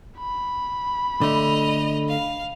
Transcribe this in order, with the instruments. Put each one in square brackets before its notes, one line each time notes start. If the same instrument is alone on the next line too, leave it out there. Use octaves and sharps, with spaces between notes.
[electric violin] B5
[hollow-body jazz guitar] D3 A3 [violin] D#5 F7
[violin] F5